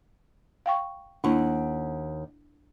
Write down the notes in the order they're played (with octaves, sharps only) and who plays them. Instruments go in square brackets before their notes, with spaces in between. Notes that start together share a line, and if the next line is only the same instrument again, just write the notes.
[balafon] F5 G5 C#6
[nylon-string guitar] D#2 F#5 [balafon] D4 E4